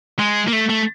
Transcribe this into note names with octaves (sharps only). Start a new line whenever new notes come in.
G#3
A#3
A3
A3